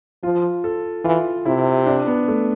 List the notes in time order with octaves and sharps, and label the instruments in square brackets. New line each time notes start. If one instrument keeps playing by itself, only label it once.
[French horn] F3 [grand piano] F4
[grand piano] A4
[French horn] E3 [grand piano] F4
[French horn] C3 [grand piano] E4
[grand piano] D4
B3
A3